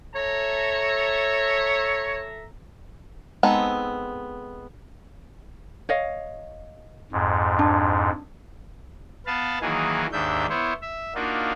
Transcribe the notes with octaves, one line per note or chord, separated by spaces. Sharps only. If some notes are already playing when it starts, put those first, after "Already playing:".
A4 C#5 E5 A#5
G#3 B3 C4 D#4 A4
C#5 D#5 F5
F2 G#2
D4
B3 B4 F5 A5
D#3 E3 F#3 A#3 D#4 G#4
D#2 G#2 D4 E5 G6
B3 E4 C5 C#5
E5
A#3 D4 D#4 F4 F#4